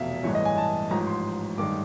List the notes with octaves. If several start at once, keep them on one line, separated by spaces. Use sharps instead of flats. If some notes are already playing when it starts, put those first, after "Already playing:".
Already playing: F1 E2 B2 E5 F5
A1 G2 E3 G#3 C#5
D#5
G#5
A5
A1 G#2 F3 A#5
C6
A1 G2 D#3 G#3 D6